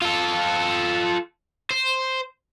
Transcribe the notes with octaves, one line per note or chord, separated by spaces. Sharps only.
F4 A4
C5